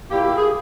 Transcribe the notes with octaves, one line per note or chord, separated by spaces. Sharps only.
A#2 A#3 E4 G4
G4
G#4